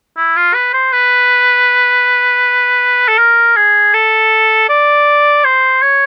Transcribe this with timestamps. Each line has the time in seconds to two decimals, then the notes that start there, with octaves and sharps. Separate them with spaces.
0.17 E4
0.36 F4
0.54 B4
0.73 C5
0.92 B4
3.08 A4
3.18 A#4
3.56 G#4
3.94 A4
4.69 D5
5.44 C5
5.82 C#5